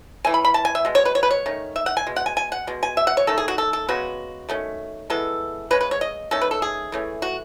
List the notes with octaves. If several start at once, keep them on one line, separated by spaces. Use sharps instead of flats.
E3 A3 C#4 G#5
B5
B5
A5
G#5
E5
B2 G#3
C#5
B4
C#5
B4
C#5
D#3 A3 C#4
E5
F#5
G#5
B2 G#3
F#5
G#5
G#5
F#5
B2 G#3
G#5
E5
F#5
C#5
D#3 A3 C#4 A4
G#4
F#4
A4
A4
C#3 G#3 B3 F#4
D#3 A3 C#4
E3 G#3 B3 A4
C#3 G#3 C#4 B4
B4
C#5
D#5
D#3 A3 C#4 A4
B4
A4
G#4
E3 A3 C#4
F#4